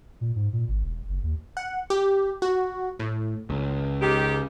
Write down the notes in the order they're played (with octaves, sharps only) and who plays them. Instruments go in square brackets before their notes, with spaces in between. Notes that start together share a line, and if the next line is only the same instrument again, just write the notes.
[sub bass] A#2
G#2
A#2
G#1
E1
F#1
D#2
[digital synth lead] F#5
G4
F#4
A2
[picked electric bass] C#2
[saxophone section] D#3 G#3 G4